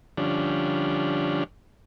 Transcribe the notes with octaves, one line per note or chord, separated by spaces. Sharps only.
D3 F3 G3 C#4 D4